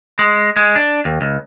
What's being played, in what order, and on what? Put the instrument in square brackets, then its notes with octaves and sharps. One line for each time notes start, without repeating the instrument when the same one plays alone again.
[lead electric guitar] G#3
G#3
D4
D#2
C#2